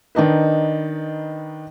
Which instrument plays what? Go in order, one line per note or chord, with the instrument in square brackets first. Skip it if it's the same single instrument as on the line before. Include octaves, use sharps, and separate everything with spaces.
[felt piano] D#3 D4 D#4 B4